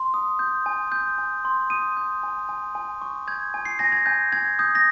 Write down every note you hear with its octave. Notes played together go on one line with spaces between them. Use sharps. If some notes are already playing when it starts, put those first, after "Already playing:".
Already playing: C6
D#6
G6
G#5
G6
G#5
C6
D#6 D#7
G6
G#5
G#5
G#5
C#6
G6 G#6
G#5
C7
G#5 A#6
G#6
G#5 G6
G#5 G#6
D#6 G6
A#6